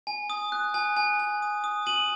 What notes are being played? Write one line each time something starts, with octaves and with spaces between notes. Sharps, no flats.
G#5
D#6
F#6
G#5
G#5
G#5
D#6
D#6
G#5 D#7 F#7